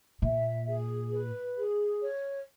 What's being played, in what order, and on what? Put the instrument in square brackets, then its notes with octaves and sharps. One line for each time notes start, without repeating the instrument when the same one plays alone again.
[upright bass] A#2 [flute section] E5
[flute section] G#4
B4
G#4
C#5